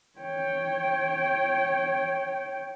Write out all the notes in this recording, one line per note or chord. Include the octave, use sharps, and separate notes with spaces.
C#5 G5